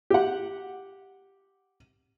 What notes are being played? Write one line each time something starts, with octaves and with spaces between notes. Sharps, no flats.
G4 F#5